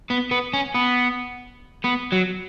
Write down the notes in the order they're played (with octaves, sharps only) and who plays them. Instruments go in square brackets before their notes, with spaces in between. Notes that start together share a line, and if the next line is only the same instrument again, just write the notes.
[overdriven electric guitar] B3
B3
C#4
B3
B3
F#3